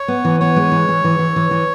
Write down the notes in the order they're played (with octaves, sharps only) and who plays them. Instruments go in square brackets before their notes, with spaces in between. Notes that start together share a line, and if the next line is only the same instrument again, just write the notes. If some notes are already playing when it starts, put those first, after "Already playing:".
Already playing: [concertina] C#5
[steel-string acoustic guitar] B3
E3
[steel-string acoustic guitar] B3 [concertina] C#5
[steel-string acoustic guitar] G#3
E3
E3
E3
E3
E3
E3